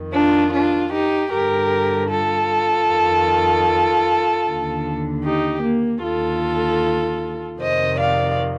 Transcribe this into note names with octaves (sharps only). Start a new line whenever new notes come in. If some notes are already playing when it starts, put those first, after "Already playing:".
Already playing: F2 D#3
D4 F4
D4 F4
D#4 G4
G2 D3 G4 A#4
F4 A4
F2 D#3
D#2 D3
D#4 G4
A#3
D#2 D3 F4 A4
F2 C3 D#3 C5 D#5
D5 F5